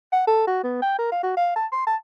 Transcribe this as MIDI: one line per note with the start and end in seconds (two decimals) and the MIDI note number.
0.12 0.27 78
0.27 0.44 69
0.47 0.62 66
0.64 0.81 59
0.82 0.97 79
0.98 1.08 70
1.11 1.22 77
1.23 1.33 66
1.37 1.51 77
1.56 1.66 81
1.72 1.83 84
1.87 1.96 81